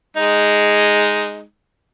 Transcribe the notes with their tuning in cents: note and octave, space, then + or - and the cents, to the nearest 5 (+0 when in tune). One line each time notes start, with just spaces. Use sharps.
G#3 +0 D#4 +0